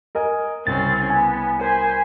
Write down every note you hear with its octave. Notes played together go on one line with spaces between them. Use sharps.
A#4 D#5 G#5
C2 C#3 C4 C#4 A6
B3 G#5
A#4 C5 G#5 B5